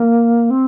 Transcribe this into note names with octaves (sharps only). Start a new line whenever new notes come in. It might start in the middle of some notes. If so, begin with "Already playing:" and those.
Already playing: A#3
C4